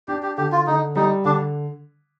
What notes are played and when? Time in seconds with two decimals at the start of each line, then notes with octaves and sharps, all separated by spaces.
0.08 D4 G4
0.23 G4
0.38 D3 G4
0.52 F4
0.67 D3 D#4
0.96 G3 D#4
1.25 D3 D4